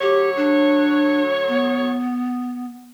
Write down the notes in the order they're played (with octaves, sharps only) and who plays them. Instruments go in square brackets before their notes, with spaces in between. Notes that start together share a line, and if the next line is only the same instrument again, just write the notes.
[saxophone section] D2 F#3 C#5 [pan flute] G4
[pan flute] D4
B3